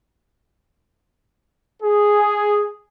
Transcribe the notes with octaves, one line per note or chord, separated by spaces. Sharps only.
G#4